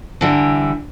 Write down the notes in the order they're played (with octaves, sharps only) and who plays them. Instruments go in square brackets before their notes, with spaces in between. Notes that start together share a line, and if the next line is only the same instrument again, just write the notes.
[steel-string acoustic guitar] D3 E3 G3